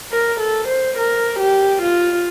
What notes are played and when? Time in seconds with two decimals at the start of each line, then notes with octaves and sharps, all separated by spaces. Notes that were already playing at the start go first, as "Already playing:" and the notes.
0.12 A#4
0.40 A4
0.68 C5
0.97 A#4
1.39 G4
1.82 F4